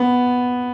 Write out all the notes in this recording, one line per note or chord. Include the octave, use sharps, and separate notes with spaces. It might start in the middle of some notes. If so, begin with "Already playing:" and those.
Already playing: B3